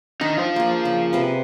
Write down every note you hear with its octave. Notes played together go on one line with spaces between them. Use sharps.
D#3 D4 D#4
F4 C5
A#3 G#4
C#3
C3 B4